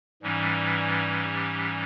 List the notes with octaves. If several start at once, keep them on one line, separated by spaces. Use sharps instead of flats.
G#2 E3 G3 C#4
G4